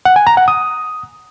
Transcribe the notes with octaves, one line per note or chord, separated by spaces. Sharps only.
F#5
G#5
A#5
F#5
D#6